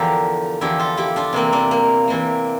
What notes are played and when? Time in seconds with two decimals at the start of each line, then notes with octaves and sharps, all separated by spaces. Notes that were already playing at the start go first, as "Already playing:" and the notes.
Already playing: E2 D3 F3 G4 A#4
0.61 E2 D3 F3 E4 G4
0.79 F4 A4
0.97 E4 G4
1.16 D4 F4
1.33 C3 E3 A#3 C4 E4
1.52 A#3 D4
1.71 A#3
2.07 C3 E3 A#3